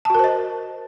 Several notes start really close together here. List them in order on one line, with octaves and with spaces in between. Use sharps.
A5 F#4 A#4 C5 D#5